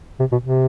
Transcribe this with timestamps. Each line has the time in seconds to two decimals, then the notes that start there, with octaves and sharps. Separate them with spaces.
0.20 C3
0.32 B2
0.44 C3